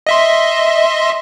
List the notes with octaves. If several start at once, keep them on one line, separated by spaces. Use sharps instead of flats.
D#5 E5 C6